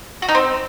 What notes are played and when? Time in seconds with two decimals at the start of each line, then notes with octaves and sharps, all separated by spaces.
0.22 F#4
0.29 D#4
0.35 C4